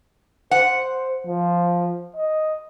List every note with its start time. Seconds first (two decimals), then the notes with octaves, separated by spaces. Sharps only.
0.51 C5 F#5
1.26 F3
2.17 D#5